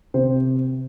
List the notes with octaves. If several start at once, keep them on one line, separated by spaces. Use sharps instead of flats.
C3 C5